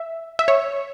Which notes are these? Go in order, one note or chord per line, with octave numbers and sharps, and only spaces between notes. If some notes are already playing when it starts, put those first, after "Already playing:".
Already playing: E5
E5
C#5